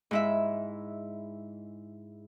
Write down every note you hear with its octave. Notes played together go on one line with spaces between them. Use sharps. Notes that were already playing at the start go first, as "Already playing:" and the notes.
G#2 E4 E5